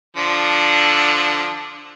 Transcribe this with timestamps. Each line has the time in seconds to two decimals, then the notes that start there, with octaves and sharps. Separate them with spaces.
0.17 D3 F3 D4